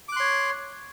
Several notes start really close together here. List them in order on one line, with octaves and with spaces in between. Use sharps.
D6 F#6 C6 C#5